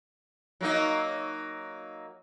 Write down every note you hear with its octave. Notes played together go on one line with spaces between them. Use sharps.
F#3 A#3 D#4